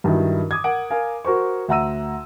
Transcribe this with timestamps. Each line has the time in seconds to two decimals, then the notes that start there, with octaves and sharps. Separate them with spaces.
0.04 G2 D#3 F#3 E4
0.51 D6 D#6 G#6
0.64 A#4 F#5 D7
0.91 A#4 F5 G#5
1.25 F#4 A#4 C5 C#6
1.68 D2 E5 F#5 A#5 E6 D#7